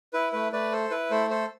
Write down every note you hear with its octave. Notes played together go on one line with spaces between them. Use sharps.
E4 B4
A3 B4
A3 B4 D5
A4 C5
E4 B4
A3 A4 C5
A4 C5